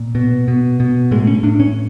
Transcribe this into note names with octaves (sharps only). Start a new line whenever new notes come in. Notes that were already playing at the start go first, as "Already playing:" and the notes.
Already playing: A#2
B2
B2
B2
A2 G#3
C#4
A2 D4
C#4